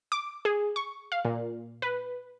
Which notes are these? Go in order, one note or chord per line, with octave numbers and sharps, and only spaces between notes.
D6
G#4
C#6
F5
A#2
B4